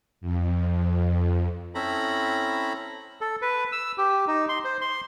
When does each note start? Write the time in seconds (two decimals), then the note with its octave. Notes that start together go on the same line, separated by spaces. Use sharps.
0.21 F2
1.75 C4 C#4 E4 A4 A#5 B5
3.21 A4
3.42 B4
3.72 E6
3.98 G4
4.27 D#4
4.49 C6
4.65 C5
4.81 C6